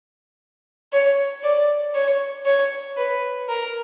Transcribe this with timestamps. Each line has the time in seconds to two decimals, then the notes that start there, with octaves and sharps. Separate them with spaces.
0.93 C#5
1.43 D5
1.94 C#5
2.45 C#5
2.97 B4
3.49 A#4